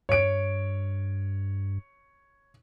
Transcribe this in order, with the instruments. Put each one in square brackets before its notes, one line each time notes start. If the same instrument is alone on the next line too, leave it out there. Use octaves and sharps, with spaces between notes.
[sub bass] G2 [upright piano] C#5 D7